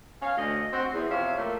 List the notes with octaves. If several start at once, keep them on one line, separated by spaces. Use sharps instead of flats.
B2 C#4 F5
D2 D#5
C4 F#4
E2
C3 F3 C#5 E5 F5
A3 A#3